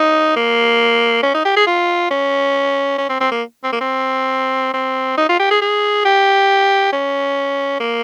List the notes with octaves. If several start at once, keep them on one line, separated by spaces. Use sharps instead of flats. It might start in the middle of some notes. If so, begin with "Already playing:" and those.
Already playing: D#4
A#3
C#4
D#4
G4
G#4
F4
C#4
C#4
C4
C4
A#3
C4
A#3
C4
C4
D#4
F4
G4
G#4
G#4
G4
C#4
A#3